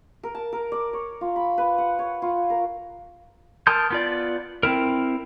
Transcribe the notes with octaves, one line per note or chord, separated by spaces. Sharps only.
A#4
A5
A#4
D5
C#5
F4
B5
B4
F#5
C#5
F4
A#4
A#4 A5 C6 D#6 G6
B3 F4 D5
C4 E4 A#4